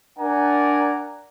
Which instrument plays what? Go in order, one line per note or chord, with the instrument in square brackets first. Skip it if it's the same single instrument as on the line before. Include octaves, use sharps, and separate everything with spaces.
[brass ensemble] D4 A#4 D5 F#5 G#5 A#5